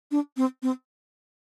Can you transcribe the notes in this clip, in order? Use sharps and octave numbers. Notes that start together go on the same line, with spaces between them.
D4
C4
C4